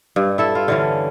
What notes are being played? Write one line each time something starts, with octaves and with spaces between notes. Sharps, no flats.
G2
E4 A4 E5
F4
D3 E3 C#4